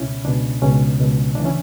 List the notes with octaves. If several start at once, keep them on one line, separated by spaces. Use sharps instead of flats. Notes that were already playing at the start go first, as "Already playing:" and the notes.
Already playing: C#2 B2 C#4 E4
C#2 B2 D4
C#2 B2 C#4
C#2 B2
D2 C#3 E3 D4
C#4 E4